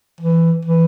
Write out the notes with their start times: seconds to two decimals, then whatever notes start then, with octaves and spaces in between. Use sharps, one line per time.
0.21 E3
0.65 E3